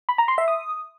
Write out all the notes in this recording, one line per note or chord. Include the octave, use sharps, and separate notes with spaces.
B5
A#5
C6
E5
D#6